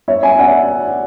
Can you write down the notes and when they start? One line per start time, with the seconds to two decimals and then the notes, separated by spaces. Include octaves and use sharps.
0.08 C#5 E5
0.23 E5 G#5
0.39 D5 F#5